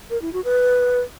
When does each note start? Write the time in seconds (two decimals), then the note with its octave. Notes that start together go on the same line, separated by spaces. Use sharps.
0.10 A#4
0.22 E4
0.33 F#4
0.45 B4